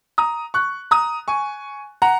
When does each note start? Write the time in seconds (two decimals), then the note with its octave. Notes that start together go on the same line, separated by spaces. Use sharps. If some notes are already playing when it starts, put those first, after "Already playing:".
0.18 A#5 D#6
0.54 C#6 F#6
0.91 A#5 D#6
1.28 G#5 C#6
2.02 F#5 A#5